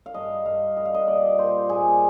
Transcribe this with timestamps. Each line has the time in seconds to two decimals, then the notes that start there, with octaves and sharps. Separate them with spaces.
0.06 F5
0.14 G2 D#5
0.45 G2 F5
0.76 G3 D#5
0.85 F5
0.94 D#5
1.07 A#2 D5
1.39 A#2 C5
1.69 A#2 G#4